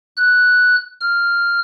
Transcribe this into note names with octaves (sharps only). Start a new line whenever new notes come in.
F#6
F6